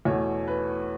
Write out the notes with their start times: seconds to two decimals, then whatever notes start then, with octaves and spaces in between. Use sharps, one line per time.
0.05 E2 B2 A3 C#5
0.48 B4